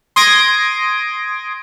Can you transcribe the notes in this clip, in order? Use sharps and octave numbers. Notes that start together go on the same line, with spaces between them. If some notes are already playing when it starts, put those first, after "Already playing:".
C6 D#6 G#6 A#6 D7